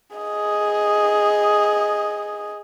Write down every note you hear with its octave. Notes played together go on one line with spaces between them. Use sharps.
G#4 D#5